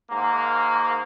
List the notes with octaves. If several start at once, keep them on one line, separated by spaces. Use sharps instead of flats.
G#2 A#3